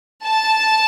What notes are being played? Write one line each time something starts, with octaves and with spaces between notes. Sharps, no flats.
A5